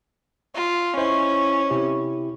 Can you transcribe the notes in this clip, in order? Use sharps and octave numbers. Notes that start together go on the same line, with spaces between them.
F4
C#4 E4 C5 D#5
C3 E4 G4